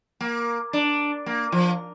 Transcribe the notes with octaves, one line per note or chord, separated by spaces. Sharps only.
A#3
D4
A#3
F3